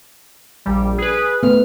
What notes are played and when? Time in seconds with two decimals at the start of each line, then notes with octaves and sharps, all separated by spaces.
0.66 A#1 G3
0.98 G#4 B4
1.43 A3 B3 F6